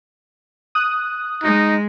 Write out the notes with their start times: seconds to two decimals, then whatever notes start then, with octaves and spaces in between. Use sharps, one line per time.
0.75 D#6 F#6
1.44 G#3 D#4